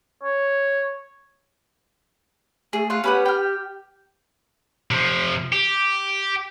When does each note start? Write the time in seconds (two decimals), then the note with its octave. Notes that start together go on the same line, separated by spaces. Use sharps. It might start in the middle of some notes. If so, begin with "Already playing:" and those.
0.23 C#5
2.73 A3 G#4
2.90 F4 F5 F#5
3.04 C#4 G4 B4 F#5
3.26 G5 F6
4.91 C3 F3
5.53 G4